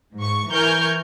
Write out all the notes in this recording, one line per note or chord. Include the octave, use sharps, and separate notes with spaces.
G#2 C#6
E3 A#4 G#5 C#6 F6 G6